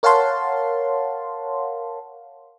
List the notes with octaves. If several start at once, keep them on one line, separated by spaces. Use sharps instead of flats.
A#4 C#5 F5 F#5 A5 C6